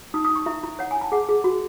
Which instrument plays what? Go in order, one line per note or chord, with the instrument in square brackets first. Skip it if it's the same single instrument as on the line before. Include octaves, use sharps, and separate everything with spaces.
[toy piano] D#4 D#6
D#6
D#4
C#6
E4 E5
E4
C#5 F#5
G#5
E4
A5
G#4 F#5
G#4
F#4